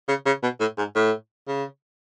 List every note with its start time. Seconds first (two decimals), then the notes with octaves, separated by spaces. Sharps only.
0.08 C#3
0.26 C#3
0.43 B2
0.60 A2
0.78 G#2
0.95 A2
1.48 C#3